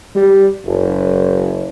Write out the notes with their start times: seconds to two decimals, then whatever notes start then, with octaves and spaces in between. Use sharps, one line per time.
0.16 G3
0.65 F#1